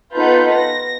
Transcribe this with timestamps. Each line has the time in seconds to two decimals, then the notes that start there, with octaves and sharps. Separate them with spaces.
0.14 B3 D#4 F4 A4 B4 G6
0.53 A#6